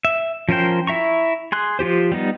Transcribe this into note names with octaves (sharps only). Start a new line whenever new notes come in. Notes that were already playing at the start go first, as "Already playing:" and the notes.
E5
F3 C#4 A#4 C5 G5
E4 E5 A#5 C#6
G#4 C6 F#6
F3 F4 G4 C5
G3 B3 D#4